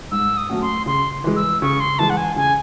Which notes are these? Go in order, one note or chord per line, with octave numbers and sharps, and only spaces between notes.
G#2 E6
D#6
F#3 A3 C#4 F#4
C6
C#3 C6
E3 G#3
E6
C#3 C#6
C6
E3 G#3 A5
F#5
G#5
C#3 G#5